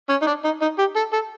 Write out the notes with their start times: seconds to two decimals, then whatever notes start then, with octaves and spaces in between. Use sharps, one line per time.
0.09 C#4
0.22 D#4
0.27 D4
0.44 D#4
0.62 D#4
0.79 G4
0.96 A4
1.13 A4